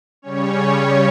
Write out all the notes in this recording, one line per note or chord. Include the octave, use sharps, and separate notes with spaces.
C#3 G3 C#4 C#5